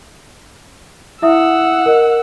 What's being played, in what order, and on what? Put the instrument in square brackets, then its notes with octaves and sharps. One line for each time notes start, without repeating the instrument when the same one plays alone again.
[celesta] E4 E5 D#6 [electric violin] F#5 E6
[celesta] A#4 D#5